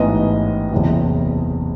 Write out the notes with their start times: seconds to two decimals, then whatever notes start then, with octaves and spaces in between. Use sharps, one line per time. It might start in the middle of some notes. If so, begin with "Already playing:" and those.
Already playing: A1 G#2 E3 G#3 B3 D#5
0.72 F#1 E2 C3 E3